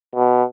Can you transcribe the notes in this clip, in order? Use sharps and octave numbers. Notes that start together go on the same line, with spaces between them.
B2